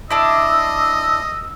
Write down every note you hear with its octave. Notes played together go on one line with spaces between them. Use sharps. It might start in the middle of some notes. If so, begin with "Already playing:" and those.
D4 E4 D#5 E6